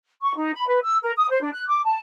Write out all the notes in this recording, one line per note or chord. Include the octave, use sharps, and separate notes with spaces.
C#6
D#4
B5
B4
E6
A#4
D#6
C5
D4
F#6
D6
A5